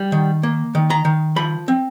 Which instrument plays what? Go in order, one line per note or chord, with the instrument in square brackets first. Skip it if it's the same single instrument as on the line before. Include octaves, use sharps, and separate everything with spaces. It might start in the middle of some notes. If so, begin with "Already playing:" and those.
Already playing: [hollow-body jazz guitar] G3
D#3
A#3
D#3
A#5
D#3
F3 B5
C4